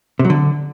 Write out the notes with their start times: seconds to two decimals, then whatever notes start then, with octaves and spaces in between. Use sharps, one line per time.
0.19 C3
0.25 F#3
0.30 D3